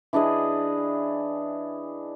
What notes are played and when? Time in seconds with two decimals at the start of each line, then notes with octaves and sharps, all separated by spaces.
0.13 E3 D4 G#4 D#5